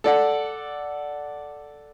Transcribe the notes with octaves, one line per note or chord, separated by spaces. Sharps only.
A4 D5 F#5